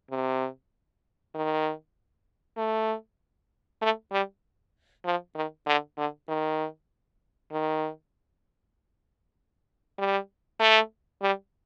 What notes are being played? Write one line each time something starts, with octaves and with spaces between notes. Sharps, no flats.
C3
D#3
A3
A3
G3
F3
D#3
D3
D3
D#3
D#3
G3
A3
G3